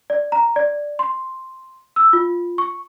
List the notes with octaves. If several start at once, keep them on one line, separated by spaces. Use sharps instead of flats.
D5
A#5
D5
C6
E6
F4
C#6